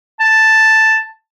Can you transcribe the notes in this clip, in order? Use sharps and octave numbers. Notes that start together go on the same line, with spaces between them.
A5